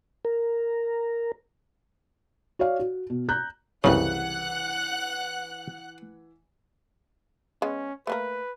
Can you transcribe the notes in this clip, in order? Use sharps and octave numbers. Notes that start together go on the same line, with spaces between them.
A#4
F#4 C#5 D5 F5
F#4
B2
A#5 F#6 G6
C2 F#2 C#3 E3 B3 F#5 F#6
G#3 B3 C#4
A3 A#3 A#4 B4